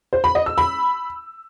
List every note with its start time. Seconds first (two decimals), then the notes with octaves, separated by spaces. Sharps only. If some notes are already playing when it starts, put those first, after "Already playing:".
0.13 C5
0.24 B5
0.35 D#5
0.46 E6
0.58 B5